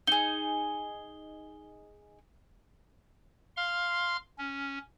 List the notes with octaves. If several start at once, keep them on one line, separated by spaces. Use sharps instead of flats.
D#4 G#4 G7
F5 C6 F6
C#4